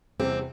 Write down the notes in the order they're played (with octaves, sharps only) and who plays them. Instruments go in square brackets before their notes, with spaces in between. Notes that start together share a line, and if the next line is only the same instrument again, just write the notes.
[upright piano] E2 C3 G3 [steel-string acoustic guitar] C4